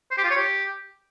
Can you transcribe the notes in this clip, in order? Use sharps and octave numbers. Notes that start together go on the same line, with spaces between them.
C5
G4
F4
C#5
G4